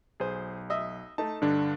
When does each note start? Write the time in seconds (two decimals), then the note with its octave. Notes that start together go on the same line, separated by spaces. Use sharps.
0.20 B1 G#4 C5
0.70 D#5 E5
1.18 A3 D#4 A5
1.42 G2 D3 D4